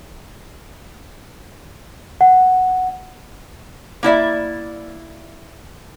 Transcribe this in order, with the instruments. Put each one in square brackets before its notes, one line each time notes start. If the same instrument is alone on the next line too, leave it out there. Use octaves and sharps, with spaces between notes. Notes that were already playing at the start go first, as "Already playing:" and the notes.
[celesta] F#5
[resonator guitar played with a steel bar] A#3 E4 D5 E5